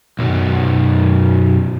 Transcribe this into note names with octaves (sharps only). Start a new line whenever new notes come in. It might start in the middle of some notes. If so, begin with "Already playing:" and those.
B1 F#2